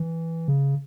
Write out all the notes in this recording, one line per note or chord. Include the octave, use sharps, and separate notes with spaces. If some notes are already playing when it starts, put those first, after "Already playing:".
Already playing: E3
C#3